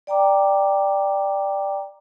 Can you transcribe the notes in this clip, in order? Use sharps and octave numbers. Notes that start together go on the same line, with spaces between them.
D5 G5 A#5 D6